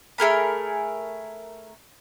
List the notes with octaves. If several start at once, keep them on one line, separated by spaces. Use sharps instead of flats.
A3 G#4 A#4 B5